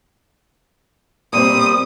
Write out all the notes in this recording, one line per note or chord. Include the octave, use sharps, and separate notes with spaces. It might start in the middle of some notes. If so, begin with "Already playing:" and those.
A#2 G3 C4 D#6